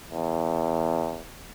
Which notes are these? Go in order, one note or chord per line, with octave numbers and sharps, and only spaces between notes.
E2